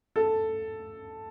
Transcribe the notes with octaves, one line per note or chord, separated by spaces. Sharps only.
A4